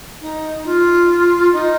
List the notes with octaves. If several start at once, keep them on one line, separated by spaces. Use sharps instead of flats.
D#4
F4
D#4